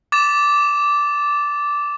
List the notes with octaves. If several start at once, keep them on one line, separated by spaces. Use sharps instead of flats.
D6 A6 E7